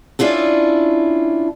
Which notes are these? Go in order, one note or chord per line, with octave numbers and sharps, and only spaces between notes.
C#4 D4 E4 F4 A4